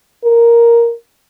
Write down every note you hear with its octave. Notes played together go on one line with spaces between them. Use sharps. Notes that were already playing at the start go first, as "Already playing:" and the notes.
A#4